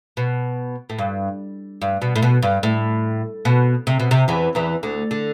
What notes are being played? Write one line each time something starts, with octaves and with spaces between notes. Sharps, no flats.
B2
A2
G2
G2
B2
A2
B2
G2
A2
B2
C3
B2
C3
E2 E3
E2 E3
D2 D3
D3